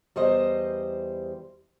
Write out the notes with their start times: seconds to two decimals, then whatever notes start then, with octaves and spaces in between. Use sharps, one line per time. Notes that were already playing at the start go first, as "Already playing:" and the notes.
0.16 E2 G3 C5 D#5